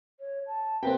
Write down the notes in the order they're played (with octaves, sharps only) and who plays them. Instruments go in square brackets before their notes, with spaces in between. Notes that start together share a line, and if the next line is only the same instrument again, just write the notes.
[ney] C#5
A5
[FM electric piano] C3 A#3 C4 [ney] B4 [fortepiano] G5